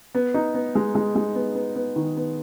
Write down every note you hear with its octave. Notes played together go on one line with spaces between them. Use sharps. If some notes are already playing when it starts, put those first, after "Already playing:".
B3
D#4
B3
G#3
G#3
G#3
B3
B3
B3
D#3
B3